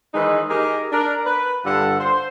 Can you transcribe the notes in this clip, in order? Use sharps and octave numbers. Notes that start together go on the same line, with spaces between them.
D#3 E3 G#3 D#4 B4 C5
D#4 G4 G#4 A#4
D4 A#4
B4
G2 D3 G3 F4 A4 F#5
C5